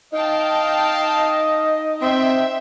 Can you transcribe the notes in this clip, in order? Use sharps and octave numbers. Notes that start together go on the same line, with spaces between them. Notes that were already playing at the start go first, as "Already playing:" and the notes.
D#4 D#5 F5 G5 A5
C4 E5 G5